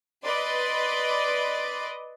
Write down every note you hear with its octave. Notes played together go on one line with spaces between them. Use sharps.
B4 D5 D#5 C6